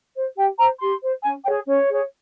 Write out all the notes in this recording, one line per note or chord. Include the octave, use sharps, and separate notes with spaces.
C5
G4 G5
C5 A#5
G4 C6
C5
C#4 G#5
G#4 C#5 G5
C#4 C#5
G#4 C#5